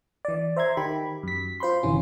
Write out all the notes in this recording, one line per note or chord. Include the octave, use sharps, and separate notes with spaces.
E3 D5
C5 E5 A#5 C6 G#6
D#3 G4 B5
F#2 B6
F4 C5 B5 C6
G1 C3 E3 C#4